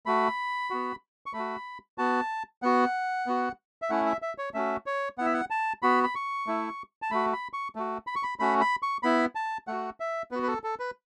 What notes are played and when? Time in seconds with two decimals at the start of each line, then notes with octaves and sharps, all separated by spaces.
0.06 A3 F#4 B5
0.70 B3 F#4
1.26 C#6
1.33 A3 B5
1.39 F#4
1.98 B3 F#4 A5
2.62 B3 F#4 F#5
3.27 B3 F#4
3.82 E5
3.90 A3 C#4 E4 F#5
4.06 E5
4.22 E5
4.38 C#5
4.54 A3 C#4 F#4 E5
4.86 C#5
5.18 B3 E4 F#5
5.26 E5
5.34 F#5
5.50 A5
5.82 B3 F#4 B5
6.04 B5
6.15 C#6
6.47 A3 E4
7.02 A5
7.11 A3 F#4 B5
7.33 B5
7.53 C#6
7.76 A3 F#4
8.07 B5
8.16 C#6
8.23 B5
8.40 A3 C#4 F#4 B5
8.61 B5
8.83 C#6
9.03 B3 E4 B5
9.35 A5
9.67 A3 F#4 F#5
10.00 E5
10.31 B3 B4
10.35 F#4
10.43 B4
10.47 A4
10.64 A4
10.80 B4